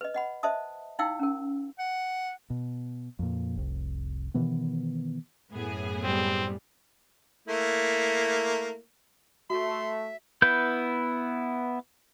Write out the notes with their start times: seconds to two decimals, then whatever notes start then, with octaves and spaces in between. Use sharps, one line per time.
0.01 B4 D#5
0.14 D#5 F#5 B5
0.43 C5 D#5 E5 A5 D#6
0.99 D#4 E4 F5 G5 E6
1.19 C#4 A#4
1.79 F#5
2.50 B2
3.19 F2 A#2
3.56 F1 C2
4.34 B2 D#3 E3 B3
5.53 F#2 A2 B3 G#4
6.04 G3 C4
7.48 A3 A#3 E4
9.50 A3 F#4 E5 C6
10.42 B3 E4 B4 G6